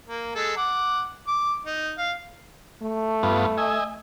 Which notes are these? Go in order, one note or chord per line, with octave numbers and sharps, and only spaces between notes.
A#3
G#3 A4
F#5 D6
D6
D#4
F5
A3
G2 B3 F4
D#5 E5 G#5